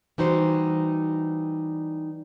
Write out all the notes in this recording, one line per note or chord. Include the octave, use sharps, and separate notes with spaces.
E3 G3 D#4 F#4 G4 C5